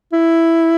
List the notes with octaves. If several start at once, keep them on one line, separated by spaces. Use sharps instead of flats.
E4